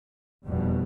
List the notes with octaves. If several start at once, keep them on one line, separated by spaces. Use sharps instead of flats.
F1 E2 B2 G3